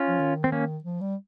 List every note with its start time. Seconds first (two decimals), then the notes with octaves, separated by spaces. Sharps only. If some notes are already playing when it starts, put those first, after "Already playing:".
Already playing: C#4 F4
0.08 F3
0.20 D#3
0.44 C4
0.52 A#3 C#4
0.84 F3
1.01 G3